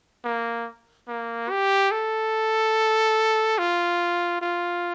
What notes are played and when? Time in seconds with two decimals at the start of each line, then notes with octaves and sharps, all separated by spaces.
0.24 A#3
1.08 A#3
1.50 G4
1.91 A4
3.58 F4
4.41 F4